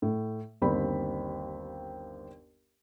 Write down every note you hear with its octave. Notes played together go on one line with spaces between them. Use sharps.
A2
G1 D#2 C4 B5